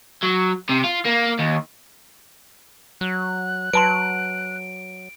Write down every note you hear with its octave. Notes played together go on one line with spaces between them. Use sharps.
F#3
C3
F4
A#3
D#2
F#3 F#6
F#3 B4 A5 C6 D7